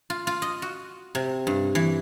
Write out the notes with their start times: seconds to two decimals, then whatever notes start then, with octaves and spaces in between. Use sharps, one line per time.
0.10 F4
0.27 F4
0.42 D#5
0.62 F#4
1.15 C3
1.47 G2
1.75 E3